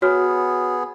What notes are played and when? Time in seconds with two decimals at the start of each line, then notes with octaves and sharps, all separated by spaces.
0.02 B3 F#4 G#4 C#5 F6